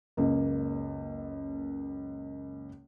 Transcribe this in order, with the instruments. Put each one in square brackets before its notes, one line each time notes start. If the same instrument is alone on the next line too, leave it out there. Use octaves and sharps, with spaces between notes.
[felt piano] F#1 C#2 A#3